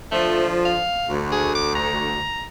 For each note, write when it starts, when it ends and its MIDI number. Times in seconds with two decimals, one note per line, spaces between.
0.11 0.82 50
0.11 0.82 53
0.11 0.47 57
0.65 1.11 77
1.10 2.25 38
1.32 1.53 68
1.55 1.72 86
1.75 2.44 82